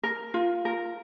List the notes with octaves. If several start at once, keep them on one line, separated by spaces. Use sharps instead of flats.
A#4
F4
A#4